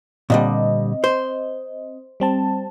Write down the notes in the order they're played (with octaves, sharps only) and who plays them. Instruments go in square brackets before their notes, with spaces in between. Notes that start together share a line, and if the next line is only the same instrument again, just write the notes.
[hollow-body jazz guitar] A#2 D3 G3 [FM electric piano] C4 D#5
[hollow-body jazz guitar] C5
[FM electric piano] G3 C4 A5